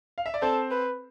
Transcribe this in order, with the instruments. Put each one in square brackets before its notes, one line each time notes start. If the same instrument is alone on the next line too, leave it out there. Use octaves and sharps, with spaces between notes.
[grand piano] F5
E5
D5
[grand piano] C4 C5 [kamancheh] A4
[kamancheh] B4